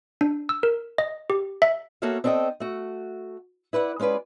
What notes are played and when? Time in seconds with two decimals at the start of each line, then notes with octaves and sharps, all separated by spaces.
0.21 D4
0.49 E6
0.63 A#4
0.98 D#5
1.30 G4
1.62 E5
2.02 A#3 F#4 A4 C#5 E5 F5
2.24 C4 D4 A4 D#5 G5
2.60 A3 F#4
3.73 E4 B4 D5 F#5
4.00 G#3 C#4 F4 B4 D5